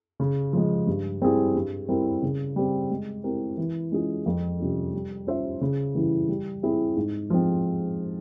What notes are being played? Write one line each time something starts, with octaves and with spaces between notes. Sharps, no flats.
C#3
F3 G#3
G2
G3 C4 E4 G#4
G2
G3 C4 E4 A#4
C#3
G3 C4
G#3
C4 E4 G4 A#4
E3
G#3 C#4 F4 G#4
F2
C3 G3 C#4 F4
G3
C#4 F4 C5 E5
C#3
E3 G3 C#4 E4
G3
C4 E4 G#4
G#2
F3 G#3 C4